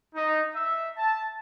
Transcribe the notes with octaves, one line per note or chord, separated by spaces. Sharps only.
D#4
E5
A5